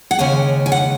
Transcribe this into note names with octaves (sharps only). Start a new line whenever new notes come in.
F#5
D#2 C#3 G#3 G#5
G#5
F#5